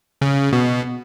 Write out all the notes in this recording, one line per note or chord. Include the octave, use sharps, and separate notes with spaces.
C#3
B2